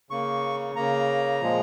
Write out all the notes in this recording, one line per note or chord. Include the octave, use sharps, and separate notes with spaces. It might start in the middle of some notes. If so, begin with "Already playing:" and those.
C#3 A#3 C#6
C#3 A#3 A#5
A#2 F3 G#3